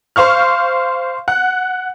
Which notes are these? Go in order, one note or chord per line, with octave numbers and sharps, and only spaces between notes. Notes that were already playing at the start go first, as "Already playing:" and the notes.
C5 F5 C#6 F6
F#5